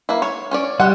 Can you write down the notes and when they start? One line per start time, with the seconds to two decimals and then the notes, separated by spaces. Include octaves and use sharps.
0.09 A#3 E4
0.22 C#5
0.51 C#4 C#5 D5
0.80 G3 G#3 F#5